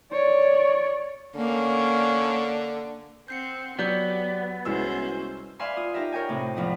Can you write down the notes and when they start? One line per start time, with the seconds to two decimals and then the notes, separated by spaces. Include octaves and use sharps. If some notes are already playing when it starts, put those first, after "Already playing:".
0.12 C#5 D5
1.36 D3 A#3 C#4
3.28 C4 F#5 G6 C7 C#7
3.79 F#3 B3 G4 D5 G6
4.65 C2 G#3 C#4 E4 F#4 B4 C5 E6
5.59 B4 D5 E5 F5 G#5 C6
5.77 F4 D#6
5.94 D#4 G4 A#4 D#5 E5
6.12 A#4 C#5 D#5 G5 G#5
6.29 A2 C3
6.56 E2 G#2 F3 E4 D#5